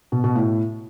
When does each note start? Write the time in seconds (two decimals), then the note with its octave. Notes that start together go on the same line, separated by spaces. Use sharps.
0.12 B2
0.24 B2
0.35 A2